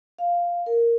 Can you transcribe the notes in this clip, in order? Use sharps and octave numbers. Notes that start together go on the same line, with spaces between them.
F5
A#4